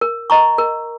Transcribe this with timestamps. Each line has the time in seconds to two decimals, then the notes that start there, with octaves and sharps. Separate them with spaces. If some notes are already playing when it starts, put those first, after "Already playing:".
0.01 A#4
0.30 D#5 A#5 C#6
0.58 A#4